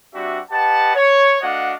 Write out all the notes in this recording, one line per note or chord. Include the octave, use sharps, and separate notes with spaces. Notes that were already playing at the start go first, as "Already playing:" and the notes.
G3 C4 D4 F#4 E5
G4 B4 D#5 F#5 A5
C#5
A3 D4 F#4 D#5 F5 F#5